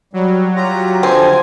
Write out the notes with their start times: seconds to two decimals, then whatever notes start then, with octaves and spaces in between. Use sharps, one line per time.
0.13 F#3 G3
0.56 F4 G4 A#5
1.03 D3 F3 C4 G#5 G#6